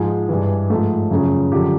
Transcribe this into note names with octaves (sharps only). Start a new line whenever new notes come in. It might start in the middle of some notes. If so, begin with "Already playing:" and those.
Already playing: G#2 F3 G#3
G2 E3
G#2 F3 A3
F#2 C#3 F3
F#2 D3 F3 G4